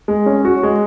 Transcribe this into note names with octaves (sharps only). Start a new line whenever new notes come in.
G#3
C#4
F#4
G#3